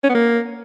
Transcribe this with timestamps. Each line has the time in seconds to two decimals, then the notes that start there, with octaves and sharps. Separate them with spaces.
0.04 C#4
0.09 B3
0.15 A#3